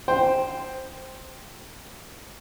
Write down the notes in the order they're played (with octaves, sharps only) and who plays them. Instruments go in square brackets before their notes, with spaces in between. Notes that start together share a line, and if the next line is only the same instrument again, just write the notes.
[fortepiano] C5 G5